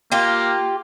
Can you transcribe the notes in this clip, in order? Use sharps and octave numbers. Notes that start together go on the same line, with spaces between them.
A#3 F4 G4